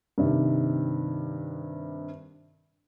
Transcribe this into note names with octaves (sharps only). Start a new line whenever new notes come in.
G2 C3 D#3